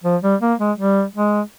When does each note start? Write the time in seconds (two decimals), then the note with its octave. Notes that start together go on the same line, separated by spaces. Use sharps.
0.04 F3
0.23 G3
0.41 A#3
0.59 G#3
0.78 G3
1.16 G#3